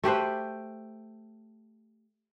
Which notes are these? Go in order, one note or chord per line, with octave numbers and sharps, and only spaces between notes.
A3 G4 B4 C5